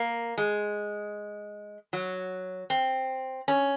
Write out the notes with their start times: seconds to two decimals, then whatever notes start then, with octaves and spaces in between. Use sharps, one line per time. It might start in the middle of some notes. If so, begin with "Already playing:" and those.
Already playing: A#3
0.38 G#3
1.93 F#3
2.70 C4
3.48 C#4